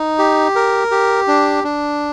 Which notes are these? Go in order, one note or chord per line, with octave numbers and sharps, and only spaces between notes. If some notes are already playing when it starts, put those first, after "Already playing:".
Already playing: D#4
G4
A#4
G4
D4
D4